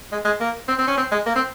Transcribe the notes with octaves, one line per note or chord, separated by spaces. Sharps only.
G#3
G#3
A#3
C4
C4
C#4
C4
G#3
A#3
C4